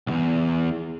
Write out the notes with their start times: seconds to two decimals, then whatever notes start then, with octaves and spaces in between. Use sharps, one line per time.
0.07 B1 E2